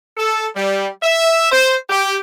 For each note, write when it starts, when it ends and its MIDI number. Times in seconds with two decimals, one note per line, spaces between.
0.17 0.48 69
0.56 0.88 55
1.02 1.51 76
1.51 1.74 72
1.89 2.19 67